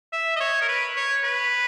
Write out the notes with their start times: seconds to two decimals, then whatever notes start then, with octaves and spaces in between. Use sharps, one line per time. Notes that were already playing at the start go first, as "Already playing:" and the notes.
0.12 E5
0.36 D#5
0.40 C#5
0.61 A#4
0.68 B4
0.96 C#5
1.23 B4